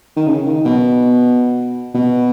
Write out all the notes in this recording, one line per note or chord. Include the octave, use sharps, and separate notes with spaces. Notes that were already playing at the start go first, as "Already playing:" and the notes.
D#3
C#3
D#3
B2
B2